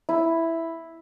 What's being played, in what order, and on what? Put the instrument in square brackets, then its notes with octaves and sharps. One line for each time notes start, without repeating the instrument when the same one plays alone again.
[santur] E4